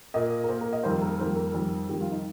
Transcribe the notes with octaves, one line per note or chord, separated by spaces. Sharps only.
A#2 A#3 D#5
A#4
A#2 A#3 C5
A#4
D#5
F2 D#3 G3 A#3 C5
A#4
F2 D#3 G3 A#3 C5
A#4
F2 D#3 G3
F2 D#3 G3 G4
F4
D#4